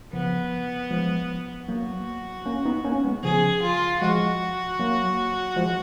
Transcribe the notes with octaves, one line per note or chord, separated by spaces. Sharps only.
C#3 F3 B3
F3 G#3
F#3 A#3 F#4
A#3 C#4
B3 D#4
A#3 C#4
G#3 B3
C#3 F3 G#4
F4
F3 G#3 F#4
F#3 A#3
F3 G#3